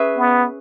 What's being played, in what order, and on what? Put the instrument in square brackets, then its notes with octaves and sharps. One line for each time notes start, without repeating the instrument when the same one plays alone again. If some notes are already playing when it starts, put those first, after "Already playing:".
Already playing: [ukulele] C#4 G#4 B4 E5
[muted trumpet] B3